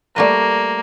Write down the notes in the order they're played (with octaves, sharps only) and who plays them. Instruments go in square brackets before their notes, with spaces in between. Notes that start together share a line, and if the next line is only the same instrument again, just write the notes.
[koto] G3 A3 B4 [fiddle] A#3